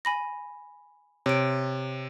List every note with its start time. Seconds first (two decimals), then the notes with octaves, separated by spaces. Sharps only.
0.05 G#5 B5 A#6
1.26 C3 C#5 D7